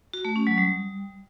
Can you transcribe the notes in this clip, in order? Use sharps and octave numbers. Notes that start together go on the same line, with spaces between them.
F#4
A3
C#4
F#3
G3